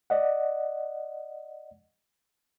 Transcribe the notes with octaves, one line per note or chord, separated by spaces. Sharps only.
D5 D#5 F#5